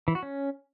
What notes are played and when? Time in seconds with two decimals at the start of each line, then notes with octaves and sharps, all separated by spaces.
0.08 E3
0.15 F#4
0.23 C#4